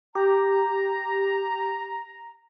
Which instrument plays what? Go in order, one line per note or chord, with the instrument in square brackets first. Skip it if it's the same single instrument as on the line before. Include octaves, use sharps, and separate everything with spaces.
[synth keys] G4 [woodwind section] A#5